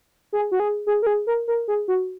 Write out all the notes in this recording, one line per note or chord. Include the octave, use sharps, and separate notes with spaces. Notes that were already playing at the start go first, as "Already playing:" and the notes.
G#4
F#4
G#4
G#4
A#4
G#4
A#4
A#4
G#4
F#4